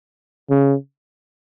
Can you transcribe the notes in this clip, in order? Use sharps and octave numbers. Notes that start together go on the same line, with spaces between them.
C#3